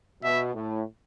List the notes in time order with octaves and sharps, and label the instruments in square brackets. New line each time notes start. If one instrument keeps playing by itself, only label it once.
[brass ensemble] B2 [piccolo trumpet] E5
[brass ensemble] A2